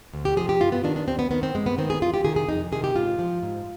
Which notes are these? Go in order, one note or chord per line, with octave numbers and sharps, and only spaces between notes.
D2
G4
C3 F3 G#4
G4
G2 F4
B3
D#3 D4
D4
D#2 C4
B3
D#3 B3
C4
G2 G#3
B3
D#3 C4
G#4
F2 F4
G4
C3 D#3 G#4
G#4
F2 D#4
C3 D#3 G#4
G4
G#2 F4
F3
G#2